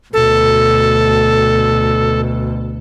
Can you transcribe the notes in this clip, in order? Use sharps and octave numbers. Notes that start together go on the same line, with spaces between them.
D2 B2 A4